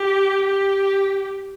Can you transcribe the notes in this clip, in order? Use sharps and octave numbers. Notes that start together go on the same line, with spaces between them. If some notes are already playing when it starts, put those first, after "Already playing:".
Already playing: G4
G4